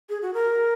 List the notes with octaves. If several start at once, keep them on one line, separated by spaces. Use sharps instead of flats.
G#4
F#4
A#4